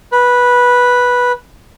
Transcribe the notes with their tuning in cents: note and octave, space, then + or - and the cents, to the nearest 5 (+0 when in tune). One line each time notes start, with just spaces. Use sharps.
B4 -10